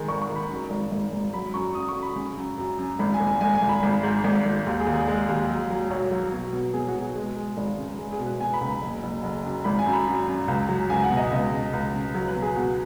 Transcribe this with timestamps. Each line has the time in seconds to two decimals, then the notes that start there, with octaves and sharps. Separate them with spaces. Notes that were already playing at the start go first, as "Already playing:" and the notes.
Already playing: D#3 G#3
0.08 G#1 C#6
0.22 C#6
0.29 D#3
0.36 B5
0.50 F#2
0.70 G#1
0.91 G#1
1.13 G#1
1.33 F#3 B5
1.54 F#2 C#6
1.75 F#2 D#6
1.88 C#6
1.95 F#2
2.02 B5
2.16 C#3
2.37 F#2
2.58 F#2
2.78 F#2
2.99 G#1 B5
3.14 G#5
3.20 G#1
3.27 G#5
3.41 G#1 G#5
3.55 G#5
3.61 G#1
3.69 B5
3.83 G#1
4.03 G#2
4.24 G#1
4.46 G#1
4.66 D#2
4.80 G#4
4.87 D#2
4.94 G#4
5.07 G#3
5.29 D#2
5.49 F#3
5.70 F#3
5.90 B1 C#5
6.11 F#3
6.32 B2
6.53 B2
6.74 B2 G#4
6.88 F#4
6.95 B2
7.01 G#4
7.15 G#3
7.36 G#3
7.57 G#1
7.77 C#3
7.98 G#3
8.12 G#4
8.19 B2
8.26 B4
8.40 B2 G#5
8.54 B5
8.61 C#2
8.68 B5
8.81 F#1
9.03 F#1
9.23 F#1
9.44 F#2
9.64 G#1 B5
9.79 G#5
9.86 F#2
9.93 B5
10.07 F#2
10.28 F#2
10.48 C#2
10.69 F#3
10.90 C#2 G#5
11.03 F#5
11.10 B2
11.17 D#5
11.31 C#2 D#5
11.52 C#3
11.73 C#2
11.94 C#3
12.15 F#3
12.28 B4
12.35 B2
12.42 G#4
12.56 B2 F#4